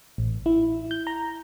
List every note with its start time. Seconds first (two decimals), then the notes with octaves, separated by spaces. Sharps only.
0.18 A1
0.46 E4
0.91 G6
1.07 A#5